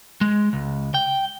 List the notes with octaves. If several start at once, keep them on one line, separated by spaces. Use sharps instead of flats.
G#3
C#2
G5